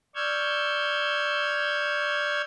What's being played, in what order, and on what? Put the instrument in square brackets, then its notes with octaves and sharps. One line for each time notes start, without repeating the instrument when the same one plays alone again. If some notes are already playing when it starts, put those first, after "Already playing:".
[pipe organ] D5 C#6 E6 F6 G6 G#6